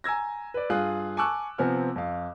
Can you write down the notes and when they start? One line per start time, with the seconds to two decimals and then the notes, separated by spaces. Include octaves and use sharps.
0.04 G#5 A#5 E6 G#6 A#6
0.54 B4 D5
0.70 G2 F4 G#4 F5 F#6
1.17 G#5 A5 C#6 D6 E6 F#6
1.58 C3 F3 B3 C4 G#5 F6
1.96 F2 F5